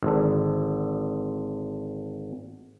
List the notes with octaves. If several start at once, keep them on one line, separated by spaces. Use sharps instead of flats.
G#1 D3